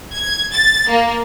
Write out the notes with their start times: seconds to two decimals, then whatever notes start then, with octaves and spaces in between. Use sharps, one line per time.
0.13 G#6
0.53 A6
0.90 A#3